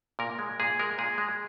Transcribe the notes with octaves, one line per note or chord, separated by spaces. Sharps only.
A#2 A#4
G#3
A#2 G#4
G#3 A#4
A#2 G#4
G#3